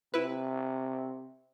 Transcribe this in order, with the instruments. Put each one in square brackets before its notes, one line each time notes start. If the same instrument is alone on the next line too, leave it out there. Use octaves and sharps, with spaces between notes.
[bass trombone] C3 [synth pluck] E4 B4